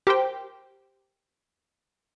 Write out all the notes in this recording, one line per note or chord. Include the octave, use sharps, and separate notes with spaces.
G4 A#4 C5 G5